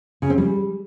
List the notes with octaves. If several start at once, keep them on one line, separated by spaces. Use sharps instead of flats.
C#3
C4
G3